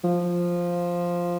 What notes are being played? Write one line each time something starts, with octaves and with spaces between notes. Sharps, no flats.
F3